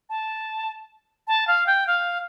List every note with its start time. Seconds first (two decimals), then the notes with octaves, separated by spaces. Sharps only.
0.10 A5
1.28 A5
1.47 F5
1.67 G5
1.87 F5